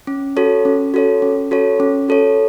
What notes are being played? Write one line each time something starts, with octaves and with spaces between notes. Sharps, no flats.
C#4
F#4 A4 C#5
C#4
F#4 A4 C#5
C#4
F#4 A4 C#5
C#4
F#4 A4 C#5